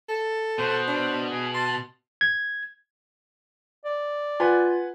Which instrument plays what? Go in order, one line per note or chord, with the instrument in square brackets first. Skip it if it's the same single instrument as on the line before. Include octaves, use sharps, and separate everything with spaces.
[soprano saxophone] A4
[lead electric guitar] B2 [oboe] C5
[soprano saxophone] D4
[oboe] G#4
[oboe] A5 [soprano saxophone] C6
[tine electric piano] G#6
[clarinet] D5
[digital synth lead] F4 [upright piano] B4 F#5 G#5